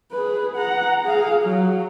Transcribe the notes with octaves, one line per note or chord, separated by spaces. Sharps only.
G#4 B4
F#5 A#5
G#4 F5
F#3